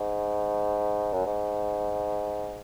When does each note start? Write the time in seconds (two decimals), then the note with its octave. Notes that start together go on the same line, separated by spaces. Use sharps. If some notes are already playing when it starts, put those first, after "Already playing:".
Already playing: G#2
1.13 F#2
1.26 G#2